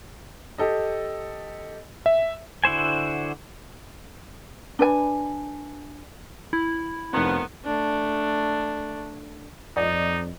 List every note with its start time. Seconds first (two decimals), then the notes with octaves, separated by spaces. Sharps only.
0.58 G4 A4 D#5
2.06 E5
2.64 D3 E4 F#4 C5 G#5
4.79 D4 B4 G#5
6.53 E4
7.13 F1 D#3 F3 B3 C4
7.65 A3 D4
9.77 F2 D#4 D5 D#5